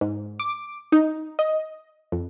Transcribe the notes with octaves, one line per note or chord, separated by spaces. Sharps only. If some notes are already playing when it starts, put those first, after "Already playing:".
G#2
D6
D#4
D#5
F2